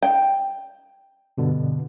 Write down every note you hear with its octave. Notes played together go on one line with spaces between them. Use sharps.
G5
G2 B2 D3